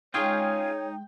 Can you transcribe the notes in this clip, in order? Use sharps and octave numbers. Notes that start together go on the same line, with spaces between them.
G#3 C#4 D#4 F4 G#4 C#5 G5